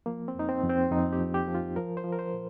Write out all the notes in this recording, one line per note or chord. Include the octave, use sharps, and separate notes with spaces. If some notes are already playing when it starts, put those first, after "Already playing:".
F3 A#3
C4
F2 D#4
C4
F2
C4
F2 D#4
G4
F3
G4
F3
F4
F3 A#4
C5
F3
A#4
C5
A#2